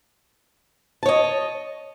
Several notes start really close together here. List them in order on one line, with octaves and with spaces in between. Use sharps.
A5 C#5 D#5